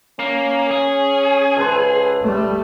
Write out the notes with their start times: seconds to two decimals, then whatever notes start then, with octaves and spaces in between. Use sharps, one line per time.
0.19 A#3 C#4
0.71 G#4
1.57 C#2 A4 B4 C5
2.22 G3 A3